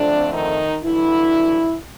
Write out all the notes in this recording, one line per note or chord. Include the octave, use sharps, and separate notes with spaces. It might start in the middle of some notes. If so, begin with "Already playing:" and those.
Already playing: F2 D3 F3 A3 C4 D4
D#3 D#4
G2 D3 E3 F#3 E4